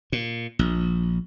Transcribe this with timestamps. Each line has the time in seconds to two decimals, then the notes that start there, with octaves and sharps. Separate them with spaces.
0.12 A#2
0.59 A#1